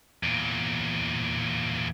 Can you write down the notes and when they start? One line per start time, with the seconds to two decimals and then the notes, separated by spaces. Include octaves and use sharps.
0.23 E2 A#2